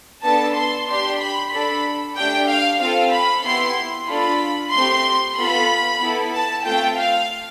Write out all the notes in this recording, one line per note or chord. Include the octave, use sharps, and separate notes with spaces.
B3 D4 A4 A5
C6
D4 G4 C6
B5
D4 A4 B5
A3 D4 G4 G5
F5
C4 F4 A4 F5
B5
B3 E4 G4 C6
D4 F4 A4 B5
A3 C4 G4 C6
B3 F4 A4 B5
B3 E4 A4
A5
A3 C4 F4 A4 G5
F5